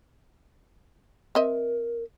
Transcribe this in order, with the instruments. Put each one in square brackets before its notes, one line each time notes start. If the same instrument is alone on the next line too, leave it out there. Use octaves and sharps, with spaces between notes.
[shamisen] C4 D#5 E5 [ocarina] A#4